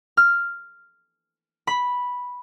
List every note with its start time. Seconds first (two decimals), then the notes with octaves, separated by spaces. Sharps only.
0.17 F6
1.67 B5